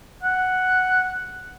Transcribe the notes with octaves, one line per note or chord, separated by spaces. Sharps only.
F#5